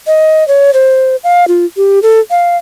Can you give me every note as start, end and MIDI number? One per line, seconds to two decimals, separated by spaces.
0.07 0.46 75
0.48 0.73 73
0.73 1.16 72
1.24 1.48 77
1.48 1.66 65
1.77 1.99 67
2.03 2.20 69
2.30 2.57 77